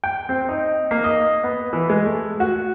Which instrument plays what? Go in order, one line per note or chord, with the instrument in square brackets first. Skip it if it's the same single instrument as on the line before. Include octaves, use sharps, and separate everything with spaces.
[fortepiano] G5
C4
D#4
A#3
D#5
B3
E3
G#3
A3
F#4